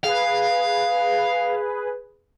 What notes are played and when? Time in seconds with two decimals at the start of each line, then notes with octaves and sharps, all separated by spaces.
0.04 G#4 B4 F5